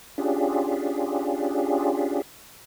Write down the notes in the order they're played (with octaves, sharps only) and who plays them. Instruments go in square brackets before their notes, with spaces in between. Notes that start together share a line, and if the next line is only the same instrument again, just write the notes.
[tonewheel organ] C#4 D4 F4 G4 G#4